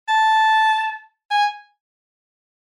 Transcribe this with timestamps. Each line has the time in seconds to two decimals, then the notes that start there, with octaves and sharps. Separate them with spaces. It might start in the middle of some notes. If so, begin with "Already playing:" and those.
0.08 A5
1.31 G#5